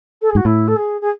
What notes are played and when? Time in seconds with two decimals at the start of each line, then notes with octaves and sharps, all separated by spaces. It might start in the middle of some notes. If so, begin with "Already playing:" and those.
0.22 A4
0.30 G#4
0.35 G#2 F#4
0.45 A2 E4
0.68 A4
0.76 G#4
1.01 G#4